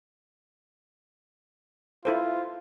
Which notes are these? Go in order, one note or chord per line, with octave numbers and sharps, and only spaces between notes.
E4 F4 A4 C5